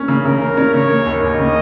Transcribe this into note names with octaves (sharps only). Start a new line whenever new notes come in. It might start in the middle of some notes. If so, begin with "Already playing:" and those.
Already playing: A#3 C#4
C#3
C#3 A#4
A#3
C#4
C#3 C#5
A#3
D#2
D#2 D#5
C#3